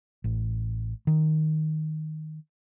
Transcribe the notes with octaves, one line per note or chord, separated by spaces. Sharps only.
A1
D#3